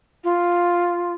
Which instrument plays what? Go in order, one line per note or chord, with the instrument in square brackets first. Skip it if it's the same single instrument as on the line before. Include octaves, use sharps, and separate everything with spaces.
[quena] F4